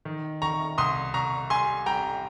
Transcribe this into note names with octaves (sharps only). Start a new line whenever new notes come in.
D#3
D#3 A#5 C#6
C2 C6 D#6
C2 A#5 C#6
G3 G#5 C6
G3 G5 A#5